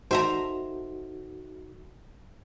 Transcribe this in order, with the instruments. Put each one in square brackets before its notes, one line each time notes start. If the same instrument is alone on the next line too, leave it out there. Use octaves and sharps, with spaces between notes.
[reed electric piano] D#4 F#4 A4 [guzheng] C5 E5 A#5